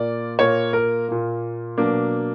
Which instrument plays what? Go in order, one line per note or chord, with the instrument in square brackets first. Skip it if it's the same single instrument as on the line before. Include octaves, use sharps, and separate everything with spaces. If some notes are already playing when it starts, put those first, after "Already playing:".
Already playing: [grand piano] A#2 A#3 D5
A#2 A#3 C#5
A#4
A#2 A#3
B2 F#3 A#3 D4